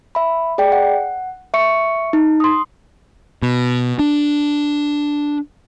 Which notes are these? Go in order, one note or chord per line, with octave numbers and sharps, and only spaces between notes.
E5 B5
G#4 D5 G5
F#5
E5 C#6 C#7
D#4
C6 D#6
B2
D4